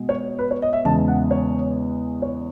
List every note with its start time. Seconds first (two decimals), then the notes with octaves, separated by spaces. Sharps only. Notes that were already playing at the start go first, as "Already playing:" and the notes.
Already playing: B2 G#3 B3
0.09 C#5
0.39 B4
0.51 C#5
0.62 D#5
0.73 E5
0.85 E2 C#3 G#3 A5
1.08 F#5
1.31 C#5
2.22 C#5